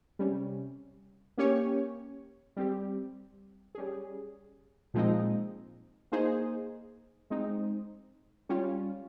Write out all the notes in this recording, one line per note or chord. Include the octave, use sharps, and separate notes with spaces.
C3 G3 C#4
A#3 C#4 G4 C#5
G3 C4 G4
G3 C#4 G#4
A#2 F3 G#3 C4 D#4
A#3 D#4 G#4 C5
G#3 C4 D#4
G3 C#4 F4